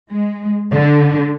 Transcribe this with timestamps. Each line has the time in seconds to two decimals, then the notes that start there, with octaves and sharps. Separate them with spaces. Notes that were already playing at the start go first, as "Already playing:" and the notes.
0.11 G#3
0.72 D3